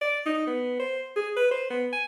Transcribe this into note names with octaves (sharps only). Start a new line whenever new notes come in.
D5
D#4
B3
C5
G#4
B4
C5
B3
G#5